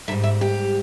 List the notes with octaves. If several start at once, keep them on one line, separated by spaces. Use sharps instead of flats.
G#2 D#3 G3 E5
E5
G4